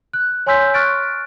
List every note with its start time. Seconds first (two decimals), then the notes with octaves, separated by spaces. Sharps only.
0.13 F#6
0.47 C#5 G#5 C6 E6 G6 B6
0.74 C#6 F6 F#6 A6 D7